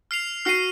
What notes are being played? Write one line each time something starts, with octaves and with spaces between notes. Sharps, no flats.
F6 C7 F7
F#4 F6 C7 D#7